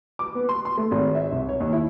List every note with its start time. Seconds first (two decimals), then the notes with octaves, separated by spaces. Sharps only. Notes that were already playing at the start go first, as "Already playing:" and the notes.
0.19 D6
0.35 B3
0.49 C6
0.65 C6
0.78 A3
0.91 G#1
1.15 E5
1.32 C2
1.49 C#5
1.60 D#2
1.73 E4